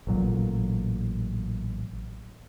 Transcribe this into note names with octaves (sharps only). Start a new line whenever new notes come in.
A1 A#2 F#3